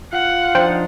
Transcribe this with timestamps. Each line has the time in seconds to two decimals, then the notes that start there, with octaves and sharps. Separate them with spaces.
0.13 F4 F5 F#5
0.55 F3 D4 D#4 C5 G5 F6